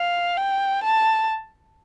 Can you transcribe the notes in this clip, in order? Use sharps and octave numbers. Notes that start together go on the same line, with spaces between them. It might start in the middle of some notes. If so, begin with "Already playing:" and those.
Already playing: F5
G5
A5